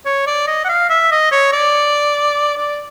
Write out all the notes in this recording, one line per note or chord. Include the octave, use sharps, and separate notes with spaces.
C#5
D5
D#5
F#5
F5
E5
D#5
C#5
D5
D5